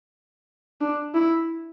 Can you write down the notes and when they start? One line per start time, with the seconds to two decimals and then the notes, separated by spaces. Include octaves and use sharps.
0.81 D4
1.15 E4